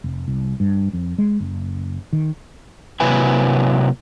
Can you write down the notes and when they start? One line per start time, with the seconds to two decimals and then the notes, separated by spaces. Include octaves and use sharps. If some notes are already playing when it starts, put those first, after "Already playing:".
0.04 F1
0.28 C2
0.60 G2
0.93 F2
1.18 G#3
1.40 F#1
2.13 D#3
3.00 C3 F#3 A#3 E4 B4 G#5